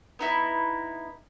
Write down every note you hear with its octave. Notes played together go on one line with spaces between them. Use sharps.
B3 D#4 E4